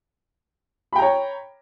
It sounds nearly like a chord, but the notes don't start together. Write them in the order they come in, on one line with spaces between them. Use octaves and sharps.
B5 G5 A#5 C#5